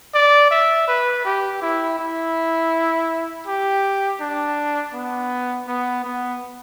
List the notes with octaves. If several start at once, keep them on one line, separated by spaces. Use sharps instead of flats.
D5
E5
B4
G4
E4
E4
G4
D4
B3
B3
B3